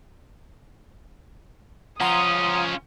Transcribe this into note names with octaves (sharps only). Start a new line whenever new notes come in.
F3 C#4 F4 F#5 A#5 C6 D#6